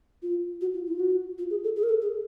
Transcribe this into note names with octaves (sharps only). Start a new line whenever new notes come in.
F4
F#4
F4
E4
F4
F#4
F4
G#4
A4
G#4
A#4
A4
G#4